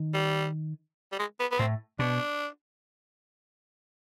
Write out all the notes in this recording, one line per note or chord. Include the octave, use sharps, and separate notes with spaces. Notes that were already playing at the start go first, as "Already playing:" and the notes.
Already playing: D#3
G3
G3
G#3
B3
B3
A2 C4
B2 D4